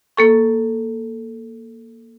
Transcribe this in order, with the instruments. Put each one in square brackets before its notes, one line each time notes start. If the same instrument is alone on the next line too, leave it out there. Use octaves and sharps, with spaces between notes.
[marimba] A#3 A4 C#6